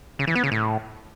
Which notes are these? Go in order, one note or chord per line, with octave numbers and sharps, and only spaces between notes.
C#3
E3
B3
C#3
A2